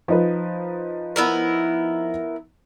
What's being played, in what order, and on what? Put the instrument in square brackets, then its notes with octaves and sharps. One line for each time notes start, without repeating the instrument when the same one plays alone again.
[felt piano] F3 D#4 B4
[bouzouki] B3 E4 A#4